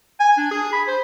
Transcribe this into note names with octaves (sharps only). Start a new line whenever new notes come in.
G#5
D4
G#4
B5
C5